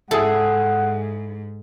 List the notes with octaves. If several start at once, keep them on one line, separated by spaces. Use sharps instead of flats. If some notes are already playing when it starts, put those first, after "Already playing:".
G#2 E4 G#4 A4 F#5